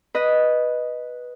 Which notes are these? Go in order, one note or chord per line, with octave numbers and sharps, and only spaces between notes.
B4 D#5